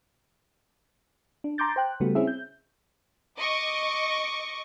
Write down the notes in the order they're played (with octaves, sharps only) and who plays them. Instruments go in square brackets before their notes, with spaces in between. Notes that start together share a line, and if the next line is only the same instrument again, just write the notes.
[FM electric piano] D4
A#5 C6 D6 G6 A6
C5 G5 F#6
C#3 G3 A3 B3 F#4
C4 C#4 E4 G#4 E5
G6
[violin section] D#5 C#6 D6